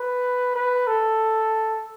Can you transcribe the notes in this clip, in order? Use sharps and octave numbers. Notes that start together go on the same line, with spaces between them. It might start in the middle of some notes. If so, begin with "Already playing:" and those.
Already playing: B4
B4
A4